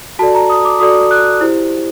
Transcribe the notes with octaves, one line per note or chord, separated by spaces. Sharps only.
F#4 A4 D5 A5
A#5
D#6
D6
F#4 A4 D5 D#6
F#6
E4 G4 C5